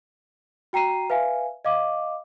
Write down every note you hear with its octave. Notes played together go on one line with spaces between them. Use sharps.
F#4 G5 A#5 C7 D#7
B4 E5 F5 G#5
D#5 F5 D6